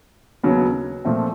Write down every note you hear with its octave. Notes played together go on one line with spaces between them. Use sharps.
D#2 C#3 F#3 B3
A#2 F3 A3 C4